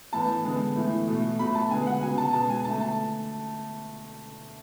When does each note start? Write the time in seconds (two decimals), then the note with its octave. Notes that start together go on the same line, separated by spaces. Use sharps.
0.13 A2 E3 B3 A5
0.45 D3 G#3 B3
0.76 A2 E3 A3
1.07 B2 A3
1.39 B2 F#3 A3 B5
1.55 A5
1.70 D3 G#3 B3 G#5
1.87 F#5
2.02 C#3 F#3 B3 G#5
2.18 A5
2.33 B2 G#3 B3 A5
2.50 G#5
2.64 D3 A3 A5
2.81 A5